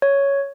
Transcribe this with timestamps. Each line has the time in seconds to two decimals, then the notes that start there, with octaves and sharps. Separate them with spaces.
0.02 C#5